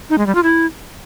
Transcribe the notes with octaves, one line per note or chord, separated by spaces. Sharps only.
D#4
G#3
G3
F4
E4